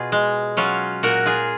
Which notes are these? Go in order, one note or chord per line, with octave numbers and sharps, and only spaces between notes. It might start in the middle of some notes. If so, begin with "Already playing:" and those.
Already playing: B2 F4 G#4
G#3
F#3 C#4 F4
A#2 F#4 A#4
F4 G#4